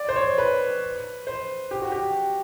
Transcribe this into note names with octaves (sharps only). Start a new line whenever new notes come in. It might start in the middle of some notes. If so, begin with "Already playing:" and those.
Already playing: D5
C5
C#5
B4
C5
G4
F#4
G4